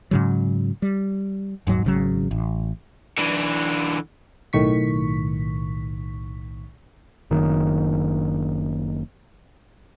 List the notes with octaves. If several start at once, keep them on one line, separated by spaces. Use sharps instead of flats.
G#2 C#3 F#3
G3
D#1 G#2 F#3
G#1 C#3 F#3
A1
D3 E3
B1 A2 D#3 C#6 B6
F#1 D#3